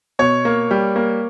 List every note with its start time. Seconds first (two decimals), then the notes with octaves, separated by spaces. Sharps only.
0.19 B2 C#5
0.45 A#3
0.71 G3
0.96 A#3